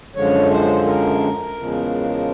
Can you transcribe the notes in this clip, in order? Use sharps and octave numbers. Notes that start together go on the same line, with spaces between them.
F#2 D3 F3 G#3 C#5
C5
A#4
E2 C#3 F3 G#3